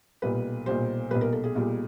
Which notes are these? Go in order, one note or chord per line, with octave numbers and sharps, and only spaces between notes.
B1 A#2 G3 B4
B1 A#2 G3 C5
B1 A#2 G3 B4
A#4
A4
G#4
B1 A#2 G3